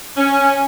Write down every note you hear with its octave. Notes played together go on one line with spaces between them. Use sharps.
C#4